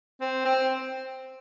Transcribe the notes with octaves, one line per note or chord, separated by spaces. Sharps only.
C4
C4